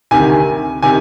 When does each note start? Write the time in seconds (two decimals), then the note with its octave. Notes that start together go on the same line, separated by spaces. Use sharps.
0.11 D2 C3 D#3 G#5
0.82 C3 D#3 G#5